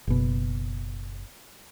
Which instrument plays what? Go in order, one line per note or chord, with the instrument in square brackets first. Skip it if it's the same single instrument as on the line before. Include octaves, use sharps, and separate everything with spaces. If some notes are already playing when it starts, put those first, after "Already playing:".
[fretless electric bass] F#1 B2